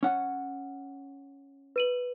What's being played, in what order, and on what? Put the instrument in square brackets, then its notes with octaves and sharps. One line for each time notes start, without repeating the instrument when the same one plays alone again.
[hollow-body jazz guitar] C#4 F#5
[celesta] B4 D#7 F#7